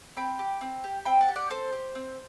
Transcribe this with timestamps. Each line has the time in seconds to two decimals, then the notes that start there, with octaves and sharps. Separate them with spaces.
0.17 C4 G5 B5
0.39 G4
0.61 C4
0.84 G4
1.05 C4 G5 B5
1.21 F#5 A5
1.28 G4
1.36 D5 F#5
1.50 C4 A4 C5
1.72 G4
1.95 C4